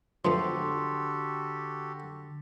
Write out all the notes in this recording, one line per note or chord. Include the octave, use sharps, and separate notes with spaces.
D3 F3 A3 B3 F#4 G4 A4 C6